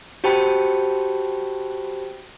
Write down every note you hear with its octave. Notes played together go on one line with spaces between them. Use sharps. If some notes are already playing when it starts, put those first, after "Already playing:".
F#4 G4 C5 G5 A5 B5